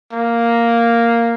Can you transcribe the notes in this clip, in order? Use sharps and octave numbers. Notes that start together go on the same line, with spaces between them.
A#3